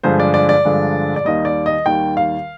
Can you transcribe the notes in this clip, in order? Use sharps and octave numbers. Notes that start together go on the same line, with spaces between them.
G2 D3 F3 G#3 C5
D5
D5
D5
G2 D3 F3 G#3
D5
D#2 D#3 G3 D#5
D5
D#5
D#2 D#3 G3 G5
F5